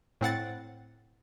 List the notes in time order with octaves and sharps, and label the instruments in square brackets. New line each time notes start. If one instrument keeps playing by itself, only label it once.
[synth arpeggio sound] A2 C4 F#5 A6